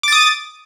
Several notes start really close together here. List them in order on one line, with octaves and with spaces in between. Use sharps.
D6 A6 D#6